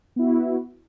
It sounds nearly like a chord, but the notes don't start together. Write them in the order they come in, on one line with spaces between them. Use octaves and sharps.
B3 E4 F#4